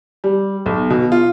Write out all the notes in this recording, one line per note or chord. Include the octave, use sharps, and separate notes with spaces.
G3
B1
B2
F4